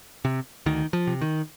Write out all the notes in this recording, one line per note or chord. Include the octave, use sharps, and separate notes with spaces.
C3
D2 D#3
F3
C3
D#3